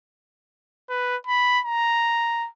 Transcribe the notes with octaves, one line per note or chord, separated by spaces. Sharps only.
B4
B5
A#5